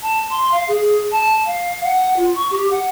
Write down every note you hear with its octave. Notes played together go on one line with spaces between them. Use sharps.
A5
C6
F5
G#4
A5
F5
F#5
F4
C#6
G4
F#5